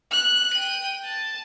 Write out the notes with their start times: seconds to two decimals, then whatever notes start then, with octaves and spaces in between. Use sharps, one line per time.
0.11 F#6
0.54 G5 D#7
1.05 A5